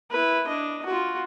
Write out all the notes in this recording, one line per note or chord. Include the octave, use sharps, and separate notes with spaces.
E4 B4
D4 D#5
F4 F#4